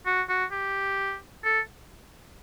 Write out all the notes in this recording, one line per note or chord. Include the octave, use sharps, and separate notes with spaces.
F#4
F#4
G4
A4